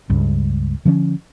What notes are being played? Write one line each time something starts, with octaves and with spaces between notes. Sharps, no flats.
C#2 G2
D3 F3 B3 C#4